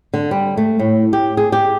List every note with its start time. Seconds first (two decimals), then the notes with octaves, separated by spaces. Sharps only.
0.14 D3
0.31 G3
0.57 A3
0.79 A2
1.13 G4
1.37 G#4
1.52 G4